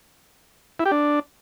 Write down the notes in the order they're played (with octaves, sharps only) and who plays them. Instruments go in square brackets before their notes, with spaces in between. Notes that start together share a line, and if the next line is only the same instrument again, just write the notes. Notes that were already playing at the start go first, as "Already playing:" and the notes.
[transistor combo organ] E4
G4
D4